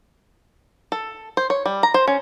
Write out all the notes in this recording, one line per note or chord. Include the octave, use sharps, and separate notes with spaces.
A4
C5
C#5
G3
A#5
C5
C#4